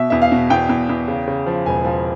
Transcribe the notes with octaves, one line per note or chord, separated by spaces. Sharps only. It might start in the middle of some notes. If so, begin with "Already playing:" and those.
Already playing: B2 E5
E2 E5
F5
B2
E2 G5
E2
E2
C#3
C#3
F3
E1 G#5
F3